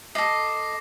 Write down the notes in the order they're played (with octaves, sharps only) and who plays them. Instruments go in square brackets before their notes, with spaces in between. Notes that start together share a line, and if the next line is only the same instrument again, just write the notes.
[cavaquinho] A4 D#5 [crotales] D6 A#6 C7